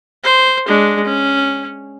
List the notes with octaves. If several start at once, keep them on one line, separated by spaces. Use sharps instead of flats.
C5
G#3 D4
C#4